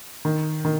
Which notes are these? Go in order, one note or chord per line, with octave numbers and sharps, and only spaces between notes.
D#3
D#3